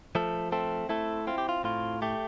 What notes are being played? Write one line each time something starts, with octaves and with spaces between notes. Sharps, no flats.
F3 A3 A4
A3 C4 A4
A3 E4 A4
C4 F4
G4
F4
A2 F4
A3 G4